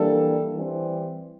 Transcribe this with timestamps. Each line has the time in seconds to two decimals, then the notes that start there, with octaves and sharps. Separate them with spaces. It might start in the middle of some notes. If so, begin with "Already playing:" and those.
Already playing: E3 G3 A#3 D4 A4
0.55 E3 G3 C4